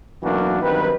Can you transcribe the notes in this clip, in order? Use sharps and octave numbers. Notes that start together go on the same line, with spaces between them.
B1 F#2 E3 A#3 D4 F#4
B1 G2 D#3 C4 B4